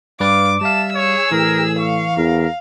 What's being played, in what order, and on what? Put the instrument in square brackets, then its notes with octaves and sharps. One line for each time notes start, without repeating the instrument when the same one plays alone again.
[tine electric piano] G2 B4 D5 [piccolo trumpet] F5 [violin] D6
[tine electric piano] G3 F5 [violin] E5 E7 [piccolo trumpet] A5
[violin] G#4 E6 [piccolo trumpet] C#5
[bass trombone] A2 [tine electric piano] E3 [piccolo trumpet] A#4
[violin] F5 [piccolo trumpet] C#6
[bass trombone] E2 [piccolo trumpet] A#4